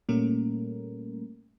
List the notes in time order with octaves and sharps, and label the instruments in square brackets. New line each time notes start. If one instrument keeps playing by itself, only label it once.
[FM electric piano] A#2 G3 A3 A#3 C#4 A#4